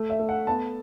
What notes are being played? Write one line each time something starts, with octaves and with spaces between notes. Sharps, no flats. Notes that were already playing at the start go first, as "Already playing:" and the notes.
Already playing: A3
E5
A3
F#5
B3 A5